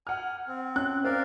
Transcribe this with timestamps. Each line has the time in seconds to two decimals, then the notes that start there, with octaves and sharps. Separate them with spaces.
0.07 F#5 G#5 F6
0.48 C4
0.76 C#4 F#6
1.05 C4 A#4 D5 F5